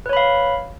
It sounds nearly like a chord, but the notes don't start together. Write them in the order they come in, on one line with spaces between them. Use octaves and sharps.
B4 C#5 B5 F5